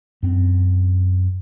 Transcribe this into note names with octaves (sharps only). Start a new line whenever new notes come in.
F#2 C4